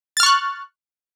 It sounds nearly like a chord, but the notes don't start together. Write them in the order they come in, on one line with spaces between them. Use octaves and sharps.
A6 F6 C#6 F#6